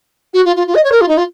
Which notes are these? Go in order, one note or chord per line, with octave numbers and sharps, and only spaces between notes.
F#4
F4
F4
F4
D#5
C#5
A#4
F4
D#4
F4